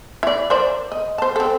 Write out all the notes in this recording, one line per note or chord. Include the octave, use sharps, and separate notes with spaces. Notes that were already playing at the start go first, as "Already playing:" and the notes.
E4 D5
A#4 C5 D5
D#5
C5 A5
C4 A4